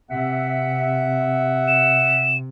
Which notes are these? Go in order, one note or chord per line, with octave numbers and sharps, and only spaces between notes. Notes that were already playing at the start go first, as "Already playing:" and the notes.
C3 E5 F#5
E7